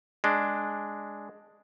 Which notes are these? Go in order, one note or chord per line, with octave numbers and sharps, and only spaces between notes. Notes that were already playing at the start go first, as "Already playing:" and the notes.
G#3 D4